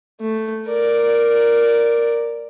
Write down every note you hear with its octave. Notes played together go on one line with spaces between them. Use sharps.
A3
A#4 D5